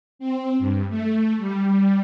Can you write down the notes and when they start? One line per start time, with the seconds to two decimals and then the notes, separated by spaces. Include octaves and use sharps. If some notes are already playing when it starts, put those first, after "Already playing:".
0.19 C4
0.59 G2
0.89 A3
1.38 G3